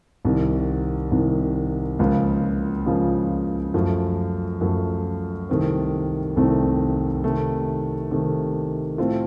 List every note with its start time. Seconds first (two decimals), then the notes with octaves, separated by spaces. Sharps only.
0.25 C2 C3 D#3
1.11 C2 C3 D#3
1.99 C#2 C#3 F3 A#3 F4
2.86 C#2 C#3 F3 A#3 F4
3.74 F#2 F3 A3
4.61 F#2 F3 A3
5.49 C2 C3 D#3 A3 C4
6.36 C2 C3 D#3 A3 C4
7.24 C3 D#3 A3
8.11 C3 D#3 A3
8.98 A2 A3 C4 F4 A4